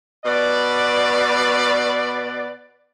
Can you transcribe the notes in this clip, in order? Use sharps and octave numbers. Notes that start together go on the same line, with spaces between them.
B2 B3 B4 D5